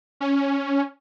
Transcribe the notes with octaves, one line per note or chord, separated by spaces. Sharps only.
C#4